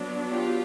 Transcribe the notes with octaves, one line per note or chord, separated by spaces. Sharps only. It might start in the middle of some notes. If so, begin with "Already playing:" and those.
Already playing: F#3 B3 D4
F4 G4